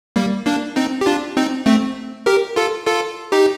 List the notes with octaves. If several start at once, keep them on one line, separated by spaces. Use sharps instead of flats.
G3 A#3
A#3 D4
C4 D#4
G4
D4 F4
C4 D#4
A3 C4
G4 A#4
F4 A4
F4 A4
D#4 G4